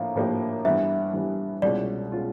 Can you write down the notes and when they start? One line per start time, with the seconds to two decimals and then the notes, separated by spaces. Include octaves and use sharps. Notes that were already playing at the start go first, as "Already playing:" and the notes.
Already playing: A2 F3 A#3 D4 F5
0.15 A2 F3 A#3 D4 G4
0.65 G2 E3 G3 B3 E5
1.13 G2 E3 G3 B3
1.62 C2 B2 G#3 C#4 F4 D5
2.12 B2 G#3 C#4 F4